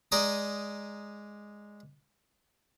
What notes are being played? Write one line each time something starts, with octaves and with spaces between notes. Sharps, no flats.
G#3 D5 A#5 D#6